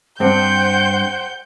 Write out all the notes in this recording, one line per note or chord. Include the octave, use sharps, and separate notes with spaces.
G2 C4 C5 F#5 G5 G6